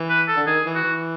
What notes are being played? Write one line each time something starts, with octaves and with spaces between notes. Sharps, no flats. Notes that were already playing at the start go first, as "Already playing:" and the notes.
Already playing: E3
B4
A4
D3
D#3 G#4
E3
F#4
E3